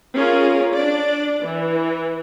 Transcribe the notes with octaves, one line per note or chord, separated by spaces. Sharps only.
C#4 F4 G#4 A#4
D4 D5
E3